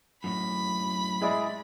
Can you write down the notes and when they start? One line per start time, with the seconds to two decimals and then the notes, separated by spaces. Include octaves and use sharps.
0.24 F#2 A2 B5
1.21 G#3 E4 G#4 D5